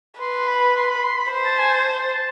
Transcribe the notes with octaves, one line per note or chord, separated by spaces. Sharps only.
B4 C6
B5
C6
B5
C6
B5
C5
A5
G#5
A5
A5